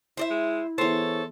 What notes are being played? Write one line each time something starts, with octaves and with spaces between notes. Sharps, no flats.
E4 C5 D5 E5
G#3
E3 B3 G#4 A4 C5 C#5